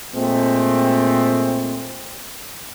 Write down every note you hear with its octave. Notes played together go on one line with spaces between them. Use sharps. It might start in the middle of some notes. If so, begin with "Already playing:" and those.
A#2 G#3 A3 C4